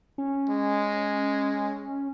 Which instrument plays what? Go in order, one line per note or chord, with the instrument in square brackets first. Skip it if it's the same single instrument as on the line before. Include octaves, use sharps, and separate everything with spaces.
[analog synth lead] C#4
[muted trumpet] G#3